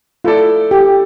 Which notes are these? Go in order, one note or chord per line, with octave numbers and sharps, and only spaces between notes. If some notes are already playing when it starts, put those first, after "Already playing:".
A3 E4 F4 A4 D5
G4